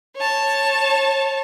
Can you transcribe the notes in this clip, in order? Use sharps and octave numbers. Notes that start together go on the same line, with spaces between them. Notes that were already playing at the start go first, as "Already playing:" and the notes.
C#5 A5